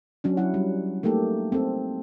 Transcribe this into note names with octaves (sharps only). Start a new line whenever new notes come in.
F#3 C#4 D4
F#3 E4 F#4 F#5
G3
A3 A#3 D#4 G4 A4
C4 A4